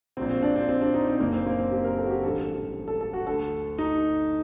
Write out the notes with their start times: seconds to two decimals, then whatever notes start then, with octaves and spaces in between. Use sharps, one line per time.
0.17 A#1 A#2 C4
0.29 C4
0.43 D4
0.56 C4
0.69 C4
0.81 D4
0.94 D#4
1.07 C4
1.20 F#1 F#2 D3 A#3
1.33 C4
1.47 A#3
1.59 C4
1.71 G4
1.84 A#4
1.97 A4
2.06 F#4
2.11 G4
2.23 A1 G2 D3 A4
2.88 A4
3.01 A4
3.13 F#4
3.26 D2 D3 A4
3.78 D#4